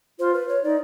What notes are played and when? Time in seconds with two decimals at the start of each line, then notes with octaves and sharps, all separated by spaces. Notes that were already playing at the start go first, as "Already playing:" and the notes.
0.19 F4 C5
0.34 B4
0.48 C#5
0.63 D#4 D5